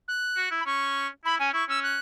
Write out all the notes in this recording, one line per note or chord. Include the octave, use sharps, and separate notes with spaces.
F#6
F#4
E4
B5
C#4 C#6
E4 B5
C#4 G#5
E4 C#6
C#4 E6
F#6